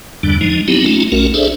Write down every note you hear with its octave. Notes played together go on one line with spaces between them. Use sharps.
E2 G2 D3 G3 D4
F3 G#3 D#4
F#3 B3 C4 D#4 E4 G4
A3 C#4 D#4 F4
B1 A3 C#4 F#4 A#4
D4 G#4 A4 C5 D5 E5